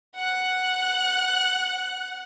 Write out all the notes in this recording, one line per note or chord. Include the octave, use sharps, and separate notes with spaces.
F#5 F#6